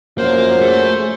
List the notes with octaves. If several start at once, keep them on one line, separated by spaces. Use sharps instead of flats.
F#2 F3 A#3 C5
A3 G#4